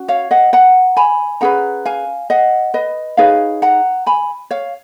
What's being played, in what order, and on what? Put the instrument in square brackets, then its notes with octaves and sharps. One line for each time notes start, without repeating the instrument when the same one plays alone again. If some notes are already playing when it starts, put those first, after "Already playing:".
Already playing: [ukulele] C#4 F#4
C#5 F5
D#5 F#5
F#5 A#5
G#5 B5
C#4 G#4 B4 F#5 A#5
F5 G#5
D#5 F#5
B4 D#5
D#4 G#4 B4 C#5 F5
F#5 A#5
G#5 B5
C#5 F5